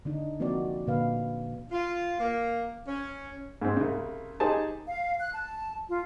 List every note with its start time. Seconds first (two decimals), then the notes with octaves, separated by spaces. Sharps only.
0.05 D3 D4 D#4
0.40 F3 A#3 C4 D#4 F#4 D5
0.87 A#2 D3 B4 F5
1.70 F4
2.19 A#3
2.87 C#4
3.62 G#2 C4
3.77 C2 C#3
4.40 D#4 G4 G#4 C5 G#5 A5
4.87 F5
5.20 F#6
5.34 A5
5.88 F4